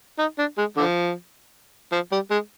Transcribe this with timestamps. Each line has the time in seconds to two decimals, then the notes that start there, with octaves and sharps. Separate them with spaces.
0.19 D#4
0.39 D4
0.58 G#3
0.77 D3 F3
1.92 F3
2.12 G3
2.31 G#3